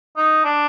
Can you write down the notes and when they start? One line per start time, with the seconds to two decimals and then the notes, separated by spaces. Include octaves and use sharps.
0.17 D#4
0.44 D4